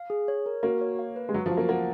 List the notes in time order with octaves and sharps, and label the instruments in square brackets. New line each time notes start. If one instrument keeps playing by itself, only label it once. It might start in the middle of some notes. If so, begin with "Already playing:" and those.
Already playing: [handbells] F5
G#4
C#5
A#4
[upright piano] A#3 [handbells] F#4
[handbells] C#5
F5
B4
[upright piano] G#3
[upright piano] F#3 [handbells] F#4
[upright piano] F3
[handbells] F5
[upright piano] A#3
[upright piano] A#3 [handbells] F#5